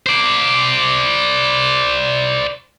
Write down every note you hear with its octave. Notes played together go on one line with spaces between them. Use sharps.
C5 D5